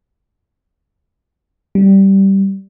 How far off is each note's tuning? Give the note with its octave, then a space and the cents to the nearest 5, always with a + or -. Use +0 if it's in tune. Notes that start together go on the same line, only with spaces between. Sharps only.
G3 -10